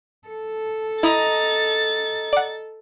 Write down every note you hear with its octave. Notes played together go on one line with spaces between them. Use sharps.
A4
E4 D#5 A#5 D#6 A6
D5 F#5